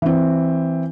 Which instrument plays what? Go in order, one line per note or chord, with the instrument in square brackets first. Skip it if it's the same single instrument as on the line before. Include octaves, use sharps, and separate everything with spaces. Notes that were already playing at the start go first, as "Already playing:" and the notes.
[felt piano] E3 C4